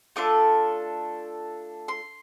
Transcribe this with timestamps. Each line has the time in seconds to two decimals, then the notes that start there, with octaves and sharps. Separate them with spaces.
0.16 A3 D4 F4 A4 D6
1.88 C6